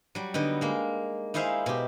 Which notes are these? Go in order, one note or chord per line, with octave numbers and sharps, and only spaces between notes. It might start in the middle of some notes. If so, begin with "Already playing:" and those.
F#3 G3
D3 B3 D#4
G#3 A#3
D#4 E4 G#4 C5 E5 F5
B2 G4